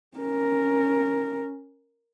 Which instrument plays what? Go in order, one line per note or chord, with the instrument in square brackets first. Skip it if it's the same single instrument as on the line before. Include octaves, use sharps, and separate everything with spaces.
[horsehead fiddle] C#4 A#4